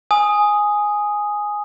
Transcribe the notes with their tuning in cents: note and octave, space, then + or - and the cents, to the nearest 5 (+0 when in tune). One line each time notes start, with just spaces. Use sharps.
G#5 +0 D#6 +0